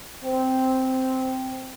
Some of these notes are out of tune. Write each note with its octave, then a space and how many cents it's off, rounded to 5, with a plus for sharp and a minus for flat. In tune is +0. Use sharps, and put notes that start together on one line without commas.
C4 -5